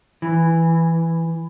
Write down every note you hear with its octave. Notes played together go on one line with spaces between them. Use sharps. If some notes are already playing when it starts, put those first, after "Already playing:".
E3